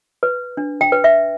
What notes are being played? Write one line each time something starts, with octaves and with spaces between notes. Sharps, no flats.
B4
D4
G5
B4
E5